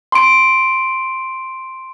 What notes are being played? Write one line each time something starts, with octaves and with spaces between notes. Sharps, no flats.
C6 D7